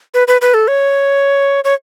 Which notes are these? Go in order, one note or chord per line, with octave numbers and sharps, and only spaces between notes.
B4
B4
B4
A4
C#5
C#5